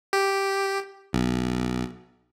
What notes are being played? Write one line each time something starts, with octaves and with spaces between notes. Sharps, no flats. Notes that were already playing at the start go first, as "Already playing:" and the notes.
G4
B1